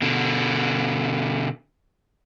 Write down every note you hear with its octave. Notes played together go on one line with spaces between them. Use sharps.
B2 D3